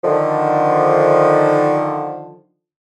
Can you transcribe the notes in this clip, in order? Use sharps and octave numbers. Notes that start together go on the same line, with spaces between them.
D3 D#3 F3